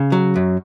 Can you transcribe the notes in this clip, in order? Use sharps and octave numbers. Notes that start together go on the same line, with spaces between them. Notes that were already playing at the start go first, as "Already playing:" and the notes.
Already playing: C#3
F#3
F#2